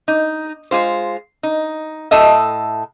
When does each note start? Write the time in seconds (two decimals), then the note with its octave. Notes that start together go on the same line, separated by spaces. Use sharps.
0.08 D#4
0.71 G#3 F4 C5
1.43 D#4
2.11 A2 A4 D#5 E5